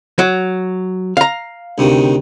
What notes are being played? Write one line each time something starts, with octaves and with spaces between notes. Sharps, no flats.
F#3
F5 A#5
D2 C3 D#3